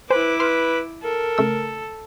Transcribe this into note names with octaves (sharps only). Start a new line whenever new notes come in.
E4 B4 C5 G#5 D6
B4 C6 F6
A4 A#4
C#3 A3 E6